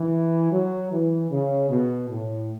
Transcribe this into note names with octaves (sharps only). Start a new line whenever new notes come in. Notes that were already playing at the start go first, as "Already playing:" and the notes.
Already playing: E3
F#3
E3
C#3
B2
A2